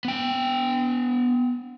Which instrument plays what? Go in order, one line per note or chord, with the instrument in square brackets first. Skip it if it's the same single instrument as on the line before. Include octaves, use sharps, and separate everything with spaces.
[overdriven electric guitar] B3 G5